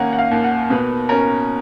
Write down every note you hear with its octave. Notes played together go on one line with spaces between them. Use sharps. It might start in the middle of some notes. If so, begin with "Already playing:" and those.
Already playing: D#3 A#3 C#4 F#5 G#5 A#5
F#5
F5
D#2
F#5
B2 B4
C#4 A#4